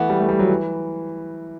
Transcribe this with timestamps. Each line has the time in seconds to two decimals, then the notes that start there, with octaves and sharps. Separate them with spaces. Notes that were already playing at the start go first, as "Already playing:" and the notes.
Already playing: E3 A3 B3 F#4
0.10 G3
0.20 A3
0.29 G3
0.39 F#3
0.50 E3